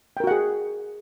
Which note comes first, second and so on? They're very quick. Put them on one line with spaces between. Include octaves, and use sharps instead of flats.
G5 A#4 F#4 F#5 G#4